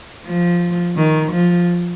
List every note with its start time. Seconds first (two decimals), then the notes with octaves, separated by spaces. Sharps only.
0.26 F3
0.96 D#3
1.32 F3